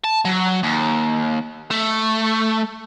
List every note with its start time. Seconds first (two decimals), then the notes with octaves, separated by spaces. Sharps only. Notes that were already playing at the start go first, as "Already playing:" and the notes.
0.04 A5
0.25 F#3
0.63 D#2
1.71 A3